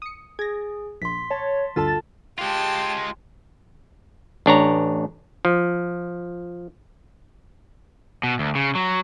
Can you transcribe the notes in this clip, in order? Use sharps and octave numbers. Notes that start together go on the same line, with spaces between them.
D#6 C#7
G#4 G#6 A#6
A#1 C6 B6
C#5 A5
D2 G2 D3 F4 A4 A5 A6
G#3 F4 G4 A5
A1 D4 C#5 A#5
F3
B2
D2
C#3
F#3